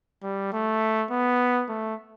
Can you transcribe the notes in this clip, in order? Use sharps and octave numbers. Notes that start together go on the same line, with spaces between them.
G3
A3
B3
A3